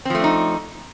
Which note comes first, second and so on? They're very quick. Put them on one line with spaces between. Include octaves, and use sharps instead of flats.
C4 F3 A3 D4 D#4